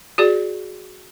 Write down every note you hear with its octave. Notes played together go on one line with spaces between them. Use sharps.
F#4 G#4 D5